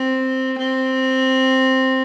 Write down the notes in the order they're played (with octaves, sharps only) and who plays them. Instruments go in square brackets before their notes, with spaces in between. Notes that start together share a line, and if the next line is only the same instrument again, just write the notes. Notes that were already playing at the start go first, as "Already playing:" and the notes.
Already playing: [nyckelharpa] C4
C4